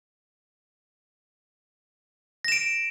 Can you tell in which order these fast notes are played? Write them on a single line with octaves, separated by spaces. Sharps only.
A#6 E7 D7